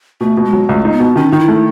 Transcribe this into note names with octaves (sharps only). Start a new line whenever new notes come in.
B2 A3
B2
G#3
F#3
C#2 A3
D#4
B3
B2
D#3 C#4
D#3 D#4
E4
A3